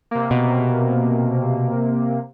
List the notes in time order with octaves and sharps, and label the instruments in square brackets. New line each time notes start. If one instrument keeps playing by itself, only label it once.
[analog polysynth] C3 A#3
[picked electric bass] B2